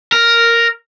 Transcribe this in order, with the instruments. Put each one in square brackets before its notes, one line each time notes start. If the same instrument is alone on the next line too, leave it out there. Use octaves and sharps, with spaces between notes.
[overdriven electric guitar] A#4